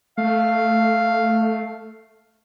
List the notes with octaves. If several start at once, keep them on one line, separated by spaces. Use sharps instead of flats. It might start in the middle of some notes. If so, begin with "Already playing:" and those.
A3 F5